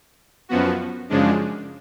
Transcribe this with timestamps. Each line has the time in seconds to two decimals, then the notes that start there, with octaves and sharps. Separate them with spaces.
0.49 F#2 F3 B3 F#4
1.09 F#2 C#3 F3 G#3 D4